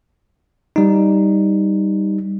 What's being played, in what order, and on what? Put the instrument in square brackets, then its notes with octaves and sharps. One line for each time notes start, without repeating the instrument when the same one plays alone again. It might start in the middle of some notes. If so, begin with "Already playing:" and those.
[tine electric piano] G3 D#4